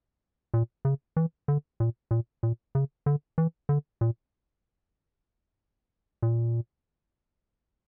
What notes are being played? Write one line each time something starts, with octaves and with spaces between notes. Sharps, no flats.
A#2
C#3
E3
D3
A#2
A#2
A#2
C#3
D3
E3
D3
A#2
A#2